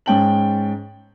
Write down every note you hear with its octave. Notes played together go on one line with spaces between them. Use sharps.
G#2 C#4 G5 A5 F#7